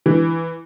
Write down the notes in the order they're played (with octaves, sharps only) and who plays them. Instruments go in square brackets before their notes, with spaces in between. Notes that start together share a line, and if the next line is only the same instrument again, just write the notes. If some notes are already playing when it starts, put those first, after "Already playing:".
[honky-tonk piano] E3